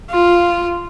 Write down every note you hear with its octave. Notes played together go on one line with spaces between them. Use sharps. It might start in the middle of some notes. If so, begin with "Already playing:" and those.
F4